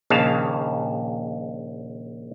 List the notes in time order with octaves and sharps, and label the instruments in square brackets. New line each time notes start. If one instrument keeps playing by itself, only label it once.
[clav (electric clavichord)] A#1 D#2 C#3 F5 A5